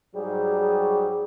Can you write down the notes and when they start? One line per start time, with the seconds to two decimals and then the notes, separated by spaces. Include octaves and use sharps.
0.15 G#2 F#3 G3 G#4